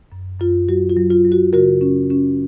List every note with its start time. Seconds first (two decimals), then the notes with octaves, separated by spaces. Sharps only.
0.12 F#2
0.40 F#2 F4
0.69 F#3 F#4
0.90 F4
0.97 F#3
1.10 F4
1.25 F#3
1.32 F#4
1.53 C#3 F#4 A#4
1.81 C#4
2.10 C#4